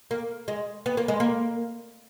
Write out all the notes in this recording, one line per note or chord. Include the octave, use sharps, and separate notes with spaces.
A#3
G#3
B3
A#3
G#3
A#3